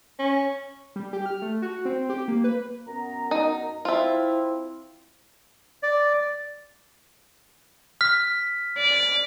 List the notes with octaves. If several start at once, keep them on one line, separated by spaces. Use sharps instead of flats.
C#4
G3
G4
F6
A3
F#4
C4
G4
A#3
B4
F#2 B3 A#5
D#4
F3 C4 E4 F4 E5
D5
F6 B6
D5